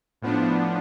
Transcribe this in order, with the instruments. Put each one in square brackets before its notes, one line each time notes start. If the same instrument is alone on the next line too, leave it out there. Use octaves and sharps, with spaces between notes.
[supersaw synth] A2 F3 B3 D4